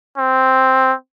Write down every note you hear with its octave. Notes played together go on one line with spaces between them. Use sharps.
C4